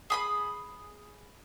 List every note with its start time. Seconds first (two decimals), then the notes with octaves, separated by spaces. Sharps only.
0.10 G#4 B5 D#6